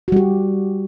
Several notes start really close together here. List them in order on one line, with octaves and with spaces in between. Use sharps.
F#4 G3 G4